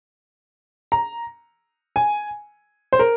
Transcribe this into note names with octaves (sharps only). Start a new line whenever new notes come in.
A#5
G#5
C5
A#4